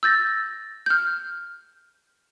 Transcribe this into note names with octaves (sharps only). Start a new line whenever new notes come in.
E6 G6 A6 A#6
F6 G6